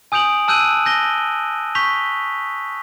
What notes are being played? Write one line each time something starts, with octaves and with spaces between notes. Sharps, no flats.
G#5 D#6 G6 D7 F7 F#7
A5 E6 F#6 G6 D#7 F#7
G6 A#6 G7
C#6 G6 B6 F7 G7